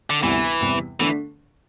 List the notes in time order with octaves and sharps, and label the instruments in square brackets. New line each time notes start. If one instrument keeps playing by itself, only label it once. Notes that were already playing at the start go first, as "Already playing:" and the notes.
[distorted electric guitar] D3
[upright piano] D2 C3 G3 B3 E4 [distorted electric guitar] E3
[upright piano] E2 C3 G3
[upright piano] D3 A3 D4 [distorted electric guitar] E3